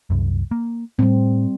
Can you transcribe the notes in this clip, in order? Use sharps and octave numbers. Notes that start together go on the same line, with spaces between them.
C2 F#2
A#3
A2 G3 C4